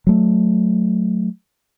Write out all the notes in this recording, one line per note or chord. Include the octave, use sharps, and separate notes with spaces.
F#3 A3